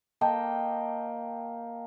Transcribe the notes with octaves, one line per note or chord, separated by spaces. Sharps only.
A#3 D#5 G5 A5